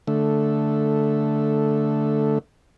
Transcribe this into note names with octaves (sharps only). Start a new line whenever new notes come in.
D3 A3